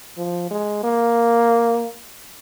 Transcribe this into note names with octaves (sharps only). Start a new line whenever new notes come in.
F3
G#3
A#3